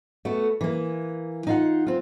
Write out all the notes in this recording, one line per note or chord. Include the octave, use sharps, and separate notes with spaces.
A3 B3 F#4
E3 A#3
D#4 F4 F#5
C4 F4